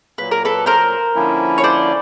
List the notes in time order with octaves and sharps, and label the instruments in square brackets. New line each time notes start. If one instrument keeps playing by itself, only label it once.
[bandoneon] A#2 F#3 A#3 [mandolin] B4
[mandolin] A#4
A4 B4
A#4 C5
[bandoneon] D3 F3 A#3 C#4 E4
[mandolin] C#5
C5 D5